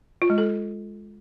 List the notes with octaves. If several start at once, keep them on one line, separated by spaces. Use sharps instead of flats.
F4
G#3
A4